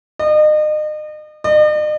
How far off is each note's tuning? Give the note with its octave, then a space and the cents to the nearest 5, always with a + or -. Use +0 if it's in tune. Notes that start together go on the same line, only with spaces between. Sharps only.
D#5 -35
D#5 -45